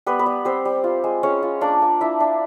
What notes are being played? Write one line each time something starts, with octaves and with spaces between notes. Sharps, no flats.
G3 B3 B4
B3 B4
G3
G3 C4 C5
G3
F4
G#3
G#3 C#4 C#5
F4
A#3 D4 D5
A#3
D4 E4 E5
D4